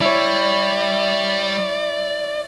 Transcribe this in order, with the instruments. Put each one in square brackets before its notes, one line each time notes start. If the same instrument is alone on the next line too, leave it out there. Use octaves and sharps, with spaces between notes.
[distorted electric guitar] G3 [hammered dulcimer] E4 C#5 [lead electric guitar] D5